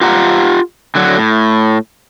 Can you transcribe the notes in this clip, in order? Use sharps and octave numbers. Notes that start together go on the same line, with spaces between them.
F4 G4 F#5 A#5
D3 F#3
A2